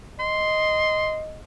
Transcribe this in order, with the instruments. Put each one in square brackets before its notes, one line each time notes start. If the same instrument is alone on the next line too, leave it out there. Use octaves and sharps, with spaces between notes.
[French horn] D#5 [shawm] C6